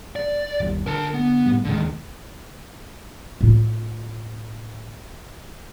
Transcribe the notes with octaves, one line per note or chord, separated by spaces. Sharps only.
D5
G1 D#2 G3
D3 A#4 A5
B3
A2 G3
D1 D#2 D3 D#3 G#3
A2 F4